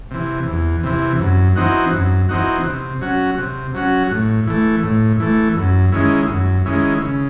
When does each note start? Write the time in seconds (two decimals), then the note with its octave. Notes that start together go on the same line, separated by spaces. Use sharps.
0.11 C3 E3
0.47 E2
0.83 C3 E3
1.19 F#2
1.56 E3 C4 D#4 F#4
1.92 F#2
2.29 E3 C4 D#4 F#4
2.65 C3
3.01 F#3 C#4 F#4
3.38 C3
3.74 F#3 C#4 F#4
4.11 A2
4.47 E3 A3
4.83 A2
5.20 E3 A3
5.57 F#2
5.92 D#3 G#3 C#4 E4
6.29 F#2
6.66 D#3 G#3 C#4 E4
7.01 C#3